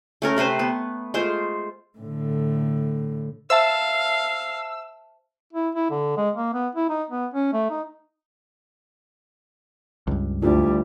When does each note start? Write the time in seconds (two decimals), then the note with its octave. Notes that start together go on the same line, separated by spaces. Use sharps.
0.22 A3 C#4 A#4
0.37 C3 A3 B4 C5
0.59 B3
1.14 G#3 A3 F4 C5
1.98 A2 D3
3.50 C5 E5 F5 A5 E6
5.53 E4
5.75 E4
5.90 D3
6.17 G#3
6.35 A#3
6.54 B3
6.75 E4
6.90 D#4
7.10 B3
7.34 C#4
7.53 A3
7.70 D#4
10.07 C#2 G2
10.42 D2 G3 D4 E4 F4